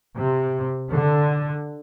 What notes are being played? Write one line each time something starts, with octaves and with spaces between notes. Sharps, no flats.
C3
D3